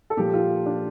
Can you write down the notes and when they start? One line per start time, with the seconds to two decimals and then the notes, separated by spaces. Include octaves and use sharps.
0.10 A4
0.17 A#2 F3 G4
0.34 F4
0.66 D4